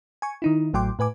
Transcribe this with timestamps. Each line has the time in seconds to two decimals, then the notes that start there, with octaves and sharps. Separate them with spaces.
0.22 G#5 C#6
0.42 D#3 D#4 E4
0.74 A1 A2 F#3 G5 C6 D6
0.99 A2 B4 G#5 D6